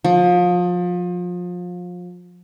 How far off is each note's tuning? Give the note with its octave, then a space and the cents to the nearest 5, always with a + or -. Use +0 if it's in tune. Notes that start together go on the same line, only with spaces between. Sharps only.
F3 +30